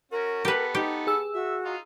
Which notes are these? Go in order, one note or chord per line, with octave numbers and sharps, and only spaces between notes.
C#4 F#4 A#4
B3 G4 A4 B4
D#4 G4
G#4 E6
F#4 E5
D#4 F4